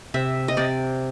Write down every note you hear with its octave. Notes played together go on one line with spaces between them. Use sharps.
C3 E5
D#5
C3 D5